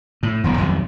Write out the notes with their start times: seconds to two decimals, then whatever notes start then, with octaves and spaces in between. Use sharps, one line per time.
0.23 A2
0.44 E1 B1 D3
0.57 B1 F2 D#3